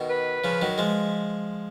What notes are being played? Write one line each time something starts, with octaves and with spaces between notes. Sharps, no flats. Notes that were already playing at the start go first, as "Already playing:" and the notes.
Already playing: B2 D#3
B4
C#3 F3
D#3 F#3
F3 G#3